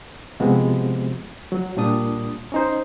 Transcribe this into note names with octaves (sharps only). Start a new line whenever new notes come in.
C3 F3 G#3 B3 F#4
F#3
A#2 G3 D4 D#6
C#4 D#4 C5